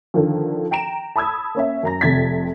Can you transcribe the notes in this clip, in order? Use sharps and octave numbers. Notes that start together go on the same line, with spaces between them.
D3 D#3 F3
G5 A#5 D7 E7
A5 B5 D#6 E6 G#6
A#3 C#4 E5
F#2 A#5 A#6
F1 F2 C3 G#6 A6 B6